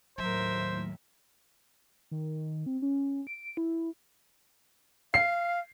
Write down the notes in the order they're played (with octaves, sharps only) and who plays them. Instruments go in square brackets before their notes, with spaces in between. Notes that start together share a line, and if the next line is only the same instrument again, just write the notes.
[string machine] D#2 A2 [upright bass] F#3 [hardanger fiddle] A#4 E5 [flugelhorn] C5
[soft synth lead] D#3
C4
C#4
D7
E4
[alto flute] F5 [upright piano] C7